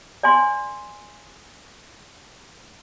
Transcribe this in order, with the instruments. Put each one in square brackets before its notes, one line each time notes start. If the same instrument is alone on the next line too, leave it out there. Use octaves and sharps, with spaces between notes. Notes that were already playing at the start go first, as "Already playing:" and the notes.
[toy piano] D5 G#5 C6